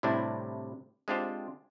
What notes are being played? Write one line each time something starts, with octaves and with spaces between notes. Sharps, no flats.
A2 C3 G3 D4 E4
G#3 C4 D4 F4 G4 C5